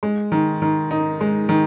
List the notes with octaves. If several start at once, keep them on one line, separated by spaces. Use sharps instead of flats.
G#3
D#3
D#3
D#4
G#3
D#3